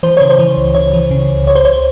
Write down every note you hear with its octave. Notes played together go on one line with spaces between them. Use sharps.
E3 C5
C#3 C#5
C5
E3
C#2
C#3 C#5
E3
C#3
C#2
C#2 C#5
C5
C#2 C#5